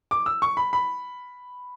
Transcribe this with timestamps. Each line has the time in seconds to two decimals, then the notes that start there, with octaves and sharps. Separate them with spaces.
0.11 D6
0.26 E6
0.42 C#6
0.57 B5
0.73 B5